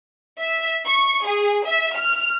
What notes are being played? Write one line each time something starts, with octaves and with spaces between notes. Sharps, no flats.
E5
C#6
G#4
E5
F6